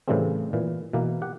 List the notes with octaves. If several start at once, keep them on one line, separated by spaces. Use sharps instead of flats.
A2 C#3 E3 G3 A3 C4
A#2 E3
B2 E3 A#3
G4 F#5